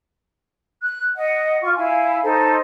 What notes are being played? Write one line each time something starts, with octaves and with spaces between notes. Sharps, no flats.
F#6
D#5 F#5
F4 C#6
E4 F5 G#5
D#4 A4 C5